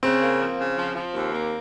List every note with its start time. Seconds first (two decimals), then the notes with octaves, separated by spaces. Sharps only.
0.03 C#3 C4
0.22 A#3
0.40 F3
0.58 C#3
0.78 F3
0.95 F3
1.14 D#2
1.32 A#3